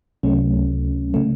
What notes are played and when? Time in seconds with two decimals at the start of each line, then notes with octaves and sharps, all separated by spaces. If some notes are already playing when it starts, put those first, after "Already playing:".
0.23 C#2 C3 F#3 A3 C#4
1.14 C#3 A3